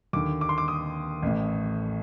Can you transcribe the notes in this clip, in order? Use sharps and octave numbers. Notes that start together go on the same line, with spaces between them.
D#2 D3 D6
D6
C6
D6
D#6
A1 A2